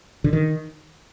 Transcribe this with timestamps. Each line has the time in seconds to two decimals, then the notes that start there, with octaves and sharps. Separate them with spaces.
0.24 D3
0.33 D#3